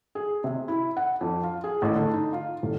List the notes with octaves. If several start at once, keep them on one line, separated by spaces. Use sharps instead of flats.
G#4
C3
E4
F#5
F2
F4
G#4
A1
D3
D#4
F4
D#1